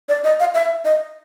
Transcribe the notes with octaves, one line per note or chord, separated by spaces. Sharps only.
D5
D#5
F5
E5
D#5